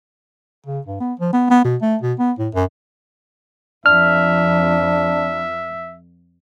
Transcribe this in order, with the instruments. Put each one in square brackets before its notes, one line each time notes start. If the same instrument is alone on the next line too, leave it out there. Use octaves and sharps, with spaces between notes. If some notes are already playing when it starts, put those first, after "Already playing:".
[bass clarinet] C#3
G2
B3
F3
B3
B3
B2
A3
B2
B3
A2
F#2
[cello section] F2 [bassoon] D4 [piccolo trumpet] E5 [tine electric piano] F6